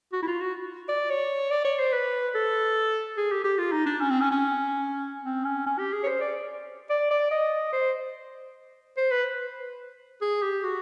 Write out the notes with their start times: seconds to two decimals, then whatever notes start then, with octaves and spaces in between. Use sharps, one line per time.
0.13 F#4
0.23 E4
0.27 F4
0.41 F#4
0.89 D5
1.10 C#5
1.51 D5
1.65 C#5
1.79 C5
1.92 B4
2.35 A4
3.17 G#4
3.31 G4
3.44 G4
3.58 F4
3.72 D#4
3.86 D4
4.00 C#4
4.10 C4
4.21 C#4
4.31 C#4
5.24 C4
5.44 C#4
5.66 C#4
5.79 G4
5.93 G#4
6.03 C#5
6.07 C5
6.20 D5
6.90 D5
7.11 D5
7.31 D#5
7.73 C5
8.97 C5
9.11 B4
10.21 G#4
10.42 G4
10.63 F#4